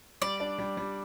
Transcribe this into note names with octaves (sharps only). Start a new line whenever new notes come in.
G3 D5
D4
G3
G3